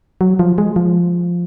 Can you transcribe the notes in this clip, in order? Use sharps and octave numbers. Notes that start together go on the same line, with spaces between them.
F#3
F3
G#3
F3